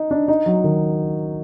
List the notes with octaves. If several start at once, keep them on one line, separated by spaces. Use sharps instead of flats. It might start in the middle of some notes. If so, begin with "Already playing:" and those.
Already playing: D#4
D4
D#4
F#3
D#3